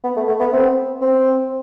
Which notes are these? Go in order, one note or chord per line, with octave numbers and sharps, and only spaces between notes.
B3
A3
A3
B3
C4
C4